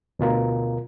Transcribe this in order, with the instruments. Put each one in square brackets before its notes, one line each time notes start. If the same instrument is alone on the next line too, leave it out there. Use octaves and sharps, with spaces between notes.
[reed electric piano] D2 B2 F4 A#4